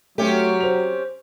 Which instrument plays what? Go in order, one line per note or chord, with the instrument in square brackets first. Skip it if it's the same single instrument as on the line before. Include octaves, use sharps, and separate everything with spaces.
[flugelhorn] F#3 [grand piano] A3 [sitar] C4 C#4 G4
[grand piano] C5 F7